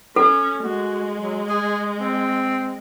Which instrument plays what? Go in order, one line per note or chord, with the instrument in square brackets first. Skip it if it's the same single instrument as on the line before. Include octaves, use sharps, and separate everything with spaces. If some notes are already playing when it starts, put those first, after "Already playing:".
[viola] C#4 [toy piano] A4
[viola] G#3 [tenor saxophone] F#4
[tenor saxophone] F#3
G#4
C4